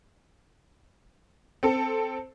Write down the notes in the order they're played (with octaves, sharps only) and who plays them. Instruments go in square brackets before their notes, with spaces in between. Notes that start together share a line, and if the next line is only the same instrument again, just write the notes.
[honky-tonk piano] C4 A4